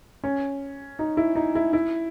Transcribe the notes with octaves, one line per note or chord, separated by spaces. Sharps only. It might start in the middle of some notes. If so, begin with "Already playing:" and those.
C#4
D#4
E4
D#4
E4
E4